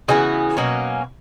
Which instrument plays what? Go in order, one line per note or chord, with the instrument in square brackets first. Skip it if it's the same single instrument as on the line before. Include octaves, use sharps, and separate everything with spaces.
[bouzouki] C#3 E3 B3 D#4 F#4
B2 F#3 A#3 C#4